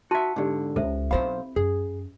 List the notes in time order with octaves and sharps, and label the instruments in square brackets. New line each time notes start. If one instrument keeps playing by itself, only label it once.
[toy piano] D#4 A5 C6 [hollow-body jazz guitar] F#4 E5
[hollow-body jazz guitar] G#2 D3 [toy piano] D#4 G4 D5
[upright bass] C#2 [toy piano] A4 C5 E5
[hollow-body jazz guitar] B1 C5 F5 [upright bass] C4 E4 [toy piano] B5
[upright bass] F#2 [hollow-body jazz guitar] G#4